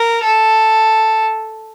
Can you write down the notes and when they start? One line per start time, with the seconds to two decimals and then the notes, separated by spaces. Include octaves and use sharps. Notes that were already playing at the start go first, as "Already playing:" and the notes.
Already playing: A#4
0.24 A4